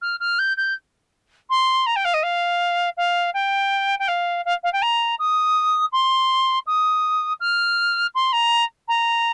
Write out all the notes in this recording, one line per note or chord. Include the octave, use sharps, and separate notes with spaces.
F6
F6
G6
G6
C6
A#5
G5
F5
D#5
F5
F5
G5
G5
F5
F5
F5
G5
A#5
D#6
C6
D#6
F6
C6
A#5
A#5